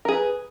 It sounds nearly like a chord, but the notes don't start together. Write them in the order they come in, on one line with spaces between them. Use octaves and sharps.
A#4 G#4 B4